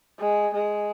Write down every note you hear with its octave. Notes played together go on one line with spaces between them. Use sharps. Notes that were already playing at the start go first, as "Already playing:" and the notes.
G#3
G#3